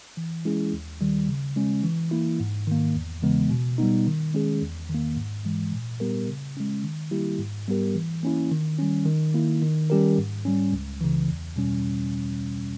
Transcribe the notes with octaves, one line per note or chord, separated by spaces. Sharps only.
E3
G#3 C#4 E4 G#4
D#2
D#3 G3
C#3
G#3 C#4
E3
A#3 E4
G#2
D#3 A#3
E2
C#3 E3 G#3 B3
B2
G3 B3 D#4
D#3
G#3 C#4 G#4
E2
D#3
A#3
G#2
E3 G#3
A#2
G3 B3 G4 A#4
C#3
G#3 C#4
D#3
G3 A#3 E4 G4
G#2
G3 B3 G4 A#4
E3
A#3 C#4 E4
D#3
G3 C#4
D#3
A#3 E4
D#3
G3 C#4 G4 A#4
G#2
G3 C#4
C#2
C#3 E3
E2
B2 G3 C#4